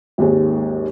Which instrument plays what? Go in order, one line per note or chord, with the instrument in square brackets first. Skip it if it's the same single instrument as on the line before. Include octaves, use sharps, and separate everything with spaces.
[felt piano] G#1 D#2 G#3